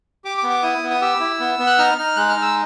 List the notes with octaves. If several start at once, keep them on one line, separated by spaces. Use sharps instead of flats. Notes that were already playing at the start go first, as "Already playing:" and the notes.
G4 D6
D6
B3
D6
E4 D#6
B3
D#6
G4 E6
E4
B3
B3
F#6
D#4 F6
D#4 F6
G#3 F#6
F6
D#4
E6